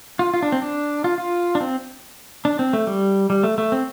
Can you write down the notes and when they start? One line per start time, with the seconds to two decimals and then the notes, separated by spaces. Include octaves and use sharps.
0.19 F4
0.34 F4
0.42 D4
0.52 C4
0.62 D4
1.04 F4
1.18 F4
1.55 D4
1.61 C4
2.45 D4
2.59 C4
2.73 A3
2.87 G3
3.30 G3
3.43 A3
3.58 A3
3.72 C4